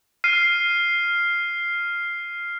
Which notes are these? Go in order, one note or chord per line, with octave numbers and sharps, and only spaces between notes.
F6 C7 D#7